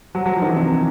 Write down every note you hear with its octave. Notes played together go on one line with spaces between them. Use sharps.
F#3
F#3
F3
D#3
E3
C3